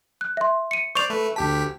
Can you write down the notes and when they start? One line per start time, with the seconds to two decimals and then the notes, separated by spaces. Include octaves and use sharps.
0.21 F#6
0.37 E5 C6
0.71 C#7 D#7
0.95 C5 D5 C#6 G6 F7
1.10 A3 B4
1.36 D2 G4 A5 B6